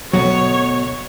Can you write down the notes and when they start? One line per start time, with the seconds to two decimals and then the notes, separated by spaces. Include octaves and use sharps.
0.13 D2 B2 F#3 C#5 F#5